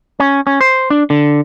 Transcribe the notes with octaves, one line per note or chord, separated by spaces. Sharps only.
C#4
C#4
C5
D4
D3